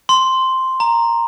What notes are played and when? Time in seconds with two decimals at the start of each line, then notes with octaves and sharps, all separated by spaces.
0.09 C6
0.80 A#5